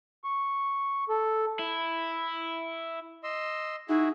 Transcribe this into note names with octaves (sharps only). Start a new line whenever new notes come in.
C#6
A4
E4
D#5 C6 E6
D#4 E4 F#4 G#4